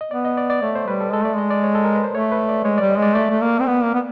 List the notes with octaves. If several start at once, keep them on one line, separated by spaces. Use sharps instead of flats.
D#5
B3 D5
D#5
D5
D5
A3 C#5
C5
G3 B4
A4
G#3 A4
A3 D5
G#3 D#5
D5
C#5
A4
A#4
B4
C5
A3 C#5
B4
D5
G#3 C#5
G3 D5
D#5
G#3 D5
A3 D5
A3
A#3
C4
B3
A#3
B3